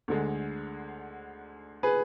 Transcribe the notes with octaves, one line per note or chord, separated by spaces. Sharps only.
D2 D3 G#3
G#4 B4